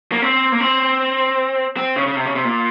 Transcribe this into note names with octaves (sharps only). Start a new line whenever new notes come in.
A#3
C4
A#3
C4
C4
C#3
C#3
C3
C#3
C3
A#2